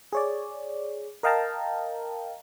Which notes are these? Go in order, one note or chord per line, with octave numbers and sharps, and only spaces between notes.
G#4 C#5 D5
A#4 D#5 F5 G5 A5 A#5